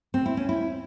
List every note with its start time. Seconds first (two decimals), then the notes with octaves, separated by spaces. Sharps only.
0.14 C4
0.26 E4
0.37 C#4
0.49 E4